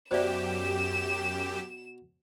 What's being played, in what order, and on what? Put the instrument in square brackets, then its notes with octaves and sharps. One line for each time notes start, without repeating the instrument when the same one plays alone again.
[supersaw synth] F#2 G4 [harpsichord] B2 [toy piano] C5 D5 E5 [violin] E7